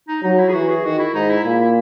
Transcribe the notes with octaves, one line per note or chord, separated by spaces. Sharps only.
D#4
F#3 D#4
E4
G#4
E3 F#4
G#4
D#3 F#4
E4
G#2 D#4
E4
A#2 E4
E4